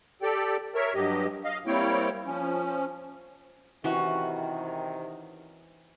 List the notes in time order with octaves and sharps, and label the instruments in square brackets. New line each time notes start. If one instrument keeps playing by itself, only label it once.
[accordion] G4 A4 D5 G5
A#4 C#5 E5
G2 F#3 G4 D#5
D#5 F5
G3 A#3 C4 E4 C#5 G5
F3 C#4
[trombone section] C3 D#3 [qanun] E3 [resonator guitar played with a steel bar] C#4 F#4